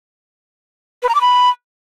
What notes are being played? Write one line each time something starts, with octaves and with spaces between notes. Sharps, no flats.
B4
A#5
D6
B5